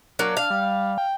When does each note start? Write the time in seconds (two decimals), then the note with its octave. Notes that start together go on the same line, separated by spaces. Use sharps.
0.19 F#3 A#3 D4
0.37 F5
0.50 G3
0.98 G5